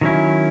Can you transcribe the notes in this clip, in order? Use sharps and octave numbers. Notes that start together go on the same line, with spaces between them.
D#3 F#3 C#4 E4